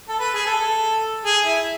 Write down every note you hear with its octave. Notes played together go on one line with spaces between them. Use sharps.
A4
B4
G#4
A4
G#4
E4